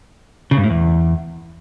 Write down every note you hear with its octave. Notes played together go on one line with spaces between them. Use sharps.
C#3
G2
A2
E2